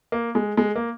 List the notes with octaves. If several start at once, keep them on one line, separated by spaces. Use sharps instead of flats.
A#3
G#3
G#3
A#3